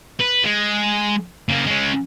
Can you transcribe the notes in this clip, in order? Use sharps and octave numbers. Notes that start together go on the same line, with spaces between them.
B4
G#3
C#3 A#3
G#3 C#4